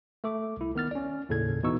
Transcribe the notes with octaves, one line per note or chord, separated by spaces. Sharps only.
A3 A4 D6
C2 E4
D#3 B3 F6 A6
C#4 D5
D#2 A2 C#3 A4 G#6
B2 E3 B3 D#4 C#6 E6